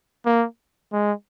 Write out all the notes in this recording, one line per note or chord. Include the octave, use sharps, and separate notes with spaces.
A#3
G#3